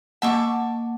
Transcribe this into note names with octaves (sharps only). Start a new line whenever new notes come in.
A#3 F#5 A5 C#6 D6